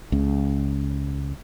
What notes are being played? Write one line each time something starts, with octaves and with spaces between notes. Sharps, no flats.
C#2 C#3